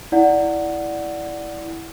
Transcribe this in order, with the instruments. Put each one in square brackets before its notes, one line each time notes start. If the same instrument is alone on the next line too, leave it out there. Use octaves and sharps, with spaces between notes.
[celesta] E4 D5 F#5